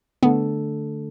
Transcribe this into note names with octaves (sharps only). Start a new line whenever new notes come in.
D3 A3 B3 D4 A4